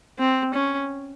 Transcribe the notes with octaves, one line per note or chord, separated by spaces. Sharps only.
C4
C#4